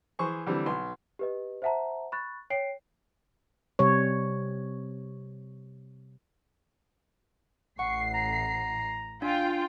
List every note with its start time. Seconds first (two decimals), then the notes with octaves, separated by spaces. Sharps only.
0.19 E3 G#4 C5 C#6
0.47 D3 E3 G3 C4
0.66 B1 C6
1.19 G4 B4 D#5
1.62 C5 E5 F#5 A5 A#5
2.12 B5 C#6 F#6 A6
2.50 C#5 G5 C7 D7
3.79 C3 G3 C#5
7.79 A1 F#5 C#6 C7
8.14 A#5
9.22 D4 F4 G5